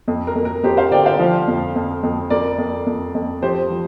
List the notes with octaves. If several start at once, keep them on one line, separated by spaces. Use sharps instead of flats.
F2
A#4
F2
A#4
F2 G4 C5
C5 F5
D3 D5 G5
C5 F5
F3
F2
F2
F2
F2 A#4 D5
F2
F2
F2
F3 G4 C5
F3